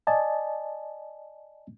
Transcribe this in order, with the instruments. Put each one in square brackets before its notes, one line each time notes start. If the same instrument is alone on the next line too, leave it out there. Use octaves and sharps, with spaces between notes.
[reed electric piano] D5 D#5 G#5 A5